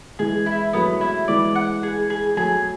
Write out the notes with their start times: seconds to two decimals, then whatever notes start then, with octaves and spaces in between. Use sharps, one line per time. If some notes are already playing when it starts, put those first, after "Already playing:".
0.19 E3 G#3 G#4
0.46 E4
0.73 F#3 A3 B3
1.01 E4
1.28 E3 G#3 D5
1.55 F#5
1.83 G#4
2.10 G#4
2.37 F#3 A3 G#4